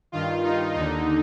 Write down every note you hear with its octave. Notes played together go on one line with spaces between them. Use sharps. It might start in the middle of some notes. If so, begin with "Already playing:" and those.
G2 D#3 F4
D#4
D#2 D3 D#4